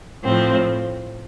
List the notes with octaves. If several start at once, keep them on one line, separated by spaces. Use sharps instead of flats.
A2 F3 C4